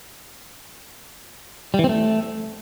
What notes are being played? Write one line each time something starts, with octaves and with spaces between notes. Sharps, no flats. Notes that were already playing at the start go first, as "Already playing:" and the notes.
G3
E3
C4
A3